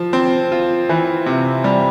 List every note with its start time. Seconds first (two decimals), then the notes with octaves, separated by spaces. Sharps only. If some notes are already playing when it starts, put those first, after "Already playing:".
Already playing: F3
0.13 C4
0.52 F4
0.89 E3
1.26 C3
1.64 G3